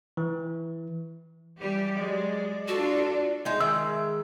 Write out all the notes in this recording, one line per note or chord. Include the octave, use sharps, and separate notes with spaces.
E3
E3 G3 G4
F#3 G#3 D5
D4 F4 F#4 A4
G#3 D#4 E5
D#3 G#3 E5 E6